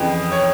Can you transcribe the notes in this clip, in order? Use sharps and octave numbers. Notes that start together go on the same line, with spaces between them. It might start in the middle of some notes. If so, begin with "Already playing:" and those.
Already playing: F2 C#3 E3 G5
C#5